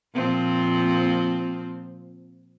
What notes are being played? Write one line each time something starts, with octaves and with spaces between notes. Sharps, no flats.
A#2 F3 C4